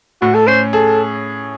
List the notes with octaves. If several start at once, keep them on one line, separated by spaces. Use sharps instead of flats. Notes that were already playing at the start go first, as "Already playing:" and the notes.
A2 F#4
A4
C#4 C5
G#4 A4